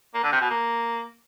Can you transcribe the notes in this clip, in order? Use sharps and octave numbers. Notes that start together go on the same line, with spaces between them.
A#3
D3
C3
B2
A#3